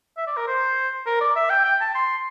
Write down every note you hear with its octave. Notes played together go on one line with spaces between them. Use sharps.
E5
D5
A#4
C5
A#4
D5
E5
G5
G5
A5
C6